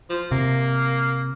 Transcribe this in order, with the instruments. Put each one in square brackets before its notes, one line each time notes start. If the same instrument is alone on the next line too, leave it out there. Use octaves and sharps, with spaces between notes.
[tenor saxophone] F3
[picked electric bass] C3 [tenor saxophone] A#3